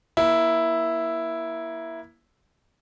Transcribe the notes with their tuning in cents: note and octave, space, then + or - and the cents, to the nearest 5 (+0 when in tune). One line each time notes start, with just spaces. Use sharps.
A#3 +25 E4 +0